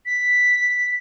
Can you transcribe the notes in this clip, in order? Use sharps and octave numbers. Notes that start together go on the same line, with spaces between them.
B6